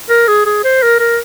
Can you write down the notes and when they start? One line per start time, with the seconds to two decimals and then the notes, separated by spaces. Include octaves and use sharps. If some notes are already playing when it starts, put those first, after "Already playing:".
0.09 A#4
0.28 G#4
0.46 G#4
0.64 C5
0.82 A#4
0.99 A#4